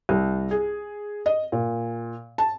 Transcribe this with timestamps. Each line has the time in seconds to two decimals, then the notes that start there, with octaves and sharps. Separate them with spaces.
0.09 C2
0.51 G#4
1.26 D#5
1.52 A#2
2.38 A5